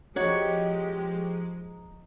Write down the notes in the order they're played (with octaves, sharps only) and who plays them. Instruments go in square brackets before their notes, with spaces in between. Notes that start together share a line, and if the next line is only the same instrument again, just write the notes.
[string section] F3 G#3 [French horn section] C4 G4 [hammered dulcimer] D#4 [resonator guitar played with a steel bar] F#4 C#5